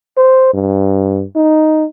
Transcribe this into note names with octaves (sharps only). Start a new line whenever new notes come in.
C5
G2
D#4